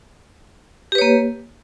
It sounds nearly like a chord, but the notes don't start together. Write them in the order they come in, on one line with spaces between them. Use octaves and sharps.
G4 B4 C#5 A#3